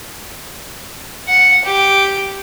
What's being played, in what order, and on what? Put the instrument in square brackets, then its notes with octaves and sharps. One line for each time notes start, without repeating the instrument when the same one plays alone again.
[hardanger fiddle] F#5
G4